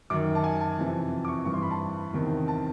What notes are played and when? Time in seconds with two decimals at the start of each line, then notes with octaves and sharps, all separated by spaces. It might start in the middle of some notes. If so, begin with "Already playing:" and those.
0.10 F#2 D#3 D6
0.35 A5
0.44 G#5
0.60 A5
0.78 F2 C3 E3
1.25 D6
1.28 C#6
1.45 G2 E3 C#6
1.54 C6
1.62 B5
1.71 A5
2.13 E2 C3 D#3
2.48 A5